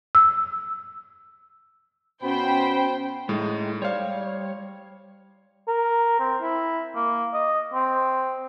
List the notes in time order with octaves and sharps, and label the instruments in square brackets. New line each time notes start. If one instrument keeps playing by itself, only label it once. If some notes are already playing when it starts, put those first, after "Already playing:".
[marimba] E6
[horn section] B2 F#4 B5 [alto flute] C#4 [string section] C5 G5
[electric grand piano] A2 [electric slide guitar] G#3 D#4
[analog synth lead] G3 [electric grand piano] C5 F5 [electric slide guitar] C#5
[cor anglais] A#4
C4
E4
A#3
D#5
C4